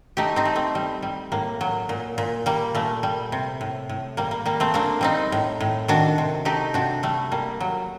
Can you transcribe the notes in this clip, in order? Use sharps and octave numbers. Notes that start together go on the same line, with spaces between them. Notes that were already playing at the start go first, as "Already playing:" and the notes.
A3 D#4 G4
C4 D#4
A3
A3 C4
G3
G3
A2 A#3
F#3
A#2
A#2
G3 A#3
A#2 A3
G3
C3
A2
A2
G3 A#3
A#3
G3 A#3
A3 C4
A#2 A#3 D4
G3 C4 D#4
A2
A2
D#3 D4 F#4
C3
A3 D#4 G4
C3 D4 F#4
G3 A3
G3 A#3
F#3